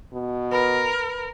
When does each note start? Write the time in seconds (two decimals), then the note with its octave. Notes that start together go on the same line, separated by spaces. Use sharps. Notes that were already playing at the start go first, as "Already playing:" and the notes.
0.13 B2
0.52 A#4 B4 B5